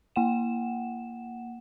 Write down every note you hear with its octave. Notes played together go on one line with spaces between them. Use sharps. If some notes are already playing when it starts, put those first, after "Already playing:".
A#3 F#5 E7